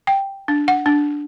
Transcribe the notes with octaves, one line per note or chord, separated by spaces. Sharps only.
G5
D4
F#5
D4